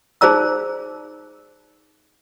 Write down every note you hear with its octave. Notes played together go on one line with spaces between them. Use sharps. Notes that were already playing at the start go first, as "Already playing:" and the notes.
D#4 G#4 C5 D5 A#5 E6